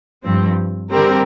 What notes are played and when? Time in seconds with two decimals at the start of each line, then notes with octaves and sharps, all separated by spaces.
0.24 G2 F3 C4
0.92 D3 G3 C4 G4 A#4